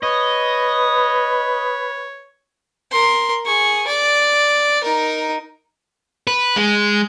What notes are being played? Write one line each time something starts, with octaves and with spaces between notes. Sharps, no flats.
B4 C#5 D#5
A#4 C6
G#4 C#6
D5
D#4 A#4
B4
G#3